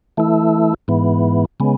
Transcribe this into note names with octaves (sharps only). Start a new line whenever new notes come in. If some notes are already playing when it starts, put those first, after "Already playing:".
E3 A3 E4
G#2 E3 B3
C#3 G#3 B3